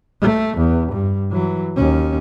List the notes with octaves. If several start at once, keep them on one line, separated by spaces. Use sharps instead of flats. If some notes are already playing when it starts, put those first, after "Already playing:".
A3
E2
G2
E3 F#3
D#2 C#4